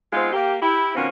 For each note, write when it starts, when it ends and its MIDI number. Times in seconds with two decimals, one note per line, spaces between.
0.12 0.28 56
0.12 0.28 59
0.12 0.28 60
0.12 0.28 63
0.12 0.28 65
0.33 0.55 58
0.33 0.55 67
0.61 0.94 64
0.61 0.94 67
0.95 1.07 47
0.95 1.07 51
0.95 1.07 53
0.95 1.07 58
0.95 1.07 60
0.95 1.07 61